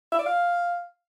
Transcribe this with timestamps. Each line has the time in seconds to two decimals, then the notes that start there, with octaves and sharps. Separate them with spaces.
0.12 E5
0.19 D5
0.26 F5